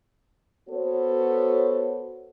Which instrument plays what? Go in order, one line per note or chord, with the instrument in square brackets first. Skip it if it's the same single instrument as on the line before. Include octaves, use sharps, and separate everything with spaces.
[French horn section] B3 F#4 A4 C5 C#5